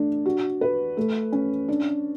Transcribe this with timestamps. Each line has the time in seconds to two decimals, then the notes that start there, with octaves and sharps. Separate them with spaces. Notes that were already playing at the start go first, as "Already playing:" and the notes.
Already playing: A3 D4
0.26 F#4
0.61 B4
0.97 A3
1.32 C#4
1.69 D4